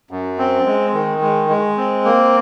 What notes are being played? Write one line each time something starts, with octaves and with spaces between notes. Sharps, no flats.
F#2
C4
G#3
D#3
G#3
G#3
C4
A#3